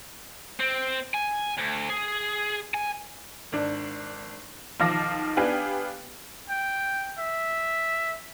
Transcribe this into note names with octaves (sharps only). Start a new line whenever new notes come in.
C4
G#5
D2
G#4
G#5
G#1 D4
B1 D#3 F3 F5 D6 A#6
B3 D4 G4 B4 F5 G#5
G5
E5